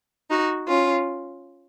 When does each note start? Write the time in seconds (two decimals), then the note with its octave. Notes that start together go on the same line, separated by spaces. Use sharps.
0.30 D#4 F#4
0.67 C#4 F4